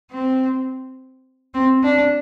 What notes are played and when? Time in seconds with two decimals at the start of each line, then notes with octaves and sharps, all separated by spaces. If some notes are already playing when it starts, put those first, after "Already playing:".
0.12 C4
1.54 C4
1.83 D4